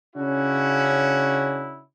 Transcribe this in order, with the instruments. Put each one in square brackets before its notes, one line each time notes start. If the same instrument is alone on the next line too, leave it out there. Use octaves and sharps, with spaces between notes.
[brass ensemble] C#3 C#4 D4 E4 F#4